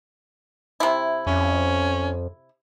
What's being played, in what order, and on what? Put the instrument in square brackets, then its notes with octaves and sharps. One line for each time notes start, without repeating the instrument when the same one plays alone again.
[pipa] C3 E4
[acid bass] F2 [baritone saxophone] C#4